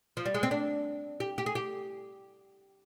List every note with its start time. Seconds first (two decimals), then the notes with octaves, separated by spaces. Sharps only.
0.17 F3
0.26 G3
0.34 G#3
0.43 C4
0.51 D4
1.20 G4
1.38 G4
1.46 G#4
1.55 G4